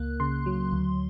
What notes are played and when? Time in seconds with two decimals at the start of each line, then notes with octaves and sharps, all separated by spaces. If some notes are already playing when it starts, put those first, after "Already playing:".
Already playing: C#2 A#3 F#6
0.20 C#3 C6
0.46 F#3
0.73 D2